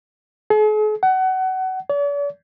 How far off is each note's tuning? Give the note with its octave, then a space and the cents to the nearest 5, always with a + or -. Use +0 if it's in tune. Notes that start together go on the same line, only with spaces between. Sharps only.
G#4 +45
F#5 +25
D5 -45